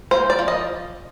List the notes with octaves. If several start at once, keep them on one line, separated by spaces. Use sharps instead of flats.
A#3 C5
D5
F3
D#5